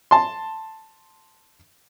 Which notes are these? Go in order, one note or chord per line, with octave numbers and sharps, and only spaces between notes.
A5 C6